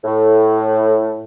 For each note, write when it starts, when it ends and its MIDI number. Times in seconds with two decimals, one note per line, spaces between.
0.04 1.24 45